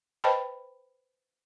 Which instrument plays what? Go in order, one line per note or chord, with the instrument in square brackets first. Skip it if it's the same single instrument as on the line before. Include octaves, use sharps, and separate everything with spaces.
[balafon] B4 C5 D#5 G5 A5 B5